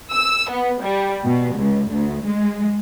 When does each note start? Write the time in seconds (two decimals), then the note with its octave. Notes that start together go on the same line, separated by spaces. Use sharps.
0.12 E6
0.50 B3
0.82 G3
1.25 B2
1.56 C#2
1.92 D2
2.26 G#3